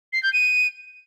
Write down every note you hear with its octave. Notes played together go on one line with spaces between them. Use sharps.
C7
G6
D#7